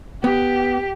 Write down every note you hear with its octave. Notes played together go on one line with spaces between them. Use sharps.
B3 G4